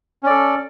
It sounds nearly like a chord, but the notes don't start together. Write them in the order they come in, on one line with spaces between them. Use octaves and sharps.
C#4 D5 A4